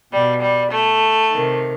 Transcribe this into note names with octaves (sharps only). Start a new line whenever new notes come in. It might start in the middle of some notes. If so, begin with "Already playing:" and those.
B2 G3
G3
A3
C3 D#3